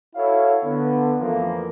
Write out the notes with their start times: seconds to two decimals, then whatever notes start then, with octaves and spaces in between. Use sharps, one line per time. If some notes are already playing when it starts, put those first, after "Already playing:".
0.16 E4 F#4 A4 C#5 F5
0.64 D3 B3
1.20 F2 E3 F3 A3 A#3